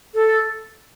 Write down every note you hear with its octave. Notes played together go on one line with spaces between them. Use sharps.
A4